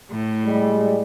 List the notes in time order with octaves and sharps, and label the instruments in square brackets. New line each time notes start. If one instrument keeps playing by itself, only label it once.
[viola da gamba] A2
[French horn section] G3 G#3